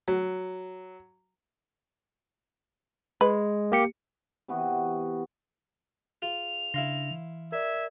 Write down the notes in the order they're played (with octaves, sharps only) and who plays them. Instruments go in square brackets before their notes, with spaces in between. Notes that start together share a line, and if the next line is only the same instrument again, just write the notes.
[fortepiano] F#3
[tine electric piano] G#3 [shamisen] B4
[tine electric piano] A#3 G4 C#7
[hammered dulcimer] C3 E3 B3 F#4
[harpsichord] F4 [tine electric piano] G#4 [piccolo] F7
[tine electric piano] C#3 D4 A#6 [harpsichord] E4 F5 C6
[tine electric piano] E3
[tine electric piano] A#4 D5 [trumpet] E5 [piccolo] G#6